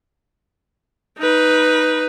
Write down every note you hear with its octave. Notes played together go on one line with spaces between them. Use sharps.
D#4 B4